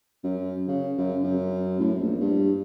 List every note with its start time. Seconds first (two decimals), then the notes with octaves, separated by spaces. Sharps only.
0.24 F#2
0.68 C#3
0.98 F#2
1.23 F#2
1.80 A2
2.01 A#1
2.20 G2